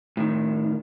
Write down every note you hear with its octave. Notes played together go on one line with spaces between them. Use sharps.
A2 D#3